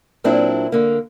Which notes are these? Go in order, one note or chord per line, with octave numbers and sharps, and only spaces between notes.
A#2 F#3 C4 D4 E4
D3 A#3